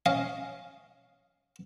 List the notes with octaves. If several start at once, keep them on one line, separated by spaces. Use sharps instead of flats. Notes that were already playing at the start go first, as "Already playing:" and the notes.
C#4 D#5 F5